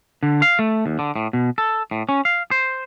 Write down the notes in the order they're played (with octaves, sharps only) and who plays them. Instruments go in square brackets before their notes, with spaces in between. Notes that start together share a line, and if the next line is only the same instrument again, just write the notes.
[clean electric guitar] D3
F5
A3
D#2
D3
A2
B2
A4
A2
C#4
F5
C5